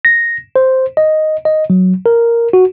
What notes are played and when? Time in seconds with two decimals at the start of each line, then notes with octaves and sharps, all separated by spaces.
0.05 A#6
0.56 C5
0.97 D#5
1.45 D#5
1.70 F#3
2.06 A#4
2.53 F#4